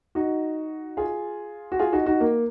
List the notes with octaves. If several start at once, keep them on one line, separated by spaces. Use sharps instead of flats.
D#4 F#4
F4 G#4
F#4
F4 G#4
D#4 F#4
D#4 F#4
A#3